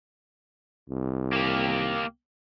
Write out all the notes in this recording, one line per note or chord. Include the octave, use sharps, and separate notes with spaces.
C2
A#3 G4